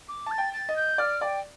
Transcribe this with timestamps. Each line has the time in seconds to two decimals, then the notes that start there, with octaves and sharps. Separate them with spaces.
0.08 D6
0.26 A5 A6
0.38 G5
0.53 A6
0.69 D#5
0.76 G6
0.98 D5 F6
1.21 D5 G5